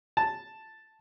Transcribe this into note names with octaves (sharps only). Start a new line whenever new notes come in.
A5